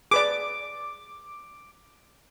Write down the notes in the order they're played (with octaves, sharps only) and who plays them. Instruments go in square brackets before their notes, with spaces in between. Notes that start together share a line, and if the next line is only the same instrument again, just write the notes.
[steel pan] G#4 B4 D5 [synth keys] D6